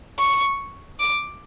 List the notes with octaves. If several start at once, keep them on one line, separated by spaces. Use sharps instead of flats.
C#6
D6